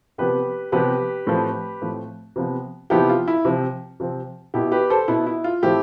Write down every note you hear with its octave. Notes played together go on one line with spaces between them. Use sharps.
C3 F3 B3 G4 B4
C3 F3 B3 G4 B4
A2 F3 C4
A2 F3 C4
C3 F3 B3
C3 F3 B3 E4 G4
F4
E4
C3 F3 C4
C3 F3 C4
B2 B3 E4 G4
G4 B4
A4 C5
B2 B3 E4
E4
F4
A2 F3 C4 E4 G4